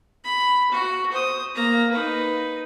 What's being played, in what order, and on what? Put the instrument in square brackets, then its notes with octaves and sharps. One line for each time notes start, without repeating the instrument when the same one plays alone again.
[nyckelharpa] B5
F#4
C5 D#6
A#3 A#5
D#4 B4